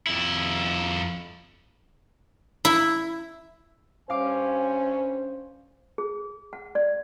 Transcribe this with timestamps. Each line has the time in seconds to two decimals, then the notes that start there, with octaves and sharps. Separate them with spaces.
0.07 F2 E4
2.65 E4
4.10 G2 C#4 C5 F5 G#5 D6
5.98 G#4
6.53 F#5
6.75 D5